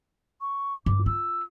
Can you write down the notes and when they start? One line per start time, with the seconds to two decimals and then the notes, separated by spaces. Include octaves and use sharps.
0.41 C#6
0.86 G2 D6
1.06 F4 E6